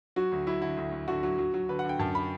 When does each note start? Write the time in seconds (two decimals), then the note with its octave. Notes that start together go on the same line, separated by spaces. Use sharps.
0.16 F#3 F#4
0.32 D2
0.47 F#3 E4
0.62 D3 E4
0.77 D2
0.92 D2
1.08 D3 F#4
1.23 F#3
1.38 F#3
1.54 F#3
1.69 D3 B4
1.79 F#5
1.84 D3
1.89 G5
1.99 F#2 A5
2.15 B5